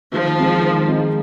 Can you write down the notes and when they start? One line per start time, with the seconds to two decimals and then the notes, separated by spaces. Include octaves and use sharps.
0.13 D#3 F3
0.38 G#3 C4 D#4
0.63 D#3
0.88 G#3 C4 D#4